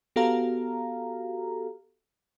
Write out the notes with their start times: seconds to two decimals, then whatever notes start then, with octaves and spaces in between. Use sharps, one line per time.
0.16 B3 F#4 G4 A4 F5 A#5